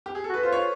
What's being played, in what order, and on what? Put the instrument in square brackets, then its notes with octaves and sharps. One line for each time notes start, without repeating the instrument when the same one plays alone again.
[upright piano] G4
G#4
A4
[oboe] F#4
[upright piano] B4
[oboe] F4 [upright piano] C5
[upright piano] C#5